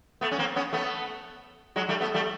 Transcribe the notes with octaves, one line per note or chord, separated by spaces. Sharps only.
A3 B3
C#4
A#3 C4
B3 C#4
A3 B3
F#3 G#3
G3 A3
A3 B3
G3 A3